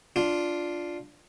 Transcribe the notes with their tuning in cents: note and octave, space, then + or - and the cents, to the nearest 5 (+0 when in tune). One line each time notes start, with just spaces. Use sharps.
D4 +0 F4 +0